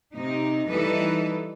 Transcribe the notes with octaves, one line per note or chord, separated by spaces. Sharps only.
C3 D#4
E3 G3 D#4 A4 B4